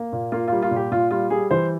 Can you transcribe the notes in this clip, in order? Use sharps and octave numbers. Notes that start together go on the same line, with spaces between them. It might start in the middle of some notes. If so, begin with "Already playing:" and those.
Already playing: A#3
A#2
A#3 F4
G3 F4
F4
A#2
G4
A#2 F4
G3 F4
G3 G#4
E3 C5